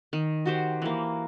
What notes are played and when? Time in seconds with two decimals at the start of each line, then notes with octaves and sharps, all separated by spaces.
0.13 D#3
0.46 F#4 G4 C5
0.82 E3 A#3